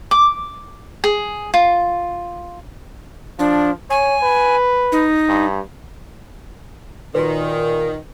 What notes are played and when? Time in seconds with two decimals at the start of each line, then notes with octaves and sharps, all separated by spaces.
0.11 D6
1.04 G#4
1.54 F4
3.39 F3 D4
3.90 C#5 G#5
4.23 B4
4.92 D#4
5.29 G2
7.15 A#2 D#3 F#4 B4